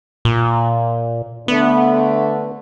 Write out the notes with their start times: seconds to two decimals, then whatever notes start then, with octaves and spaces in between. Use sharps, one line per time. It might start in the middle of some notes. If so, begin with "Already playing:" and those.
0.25 A#2
1.48 D3 A3 B3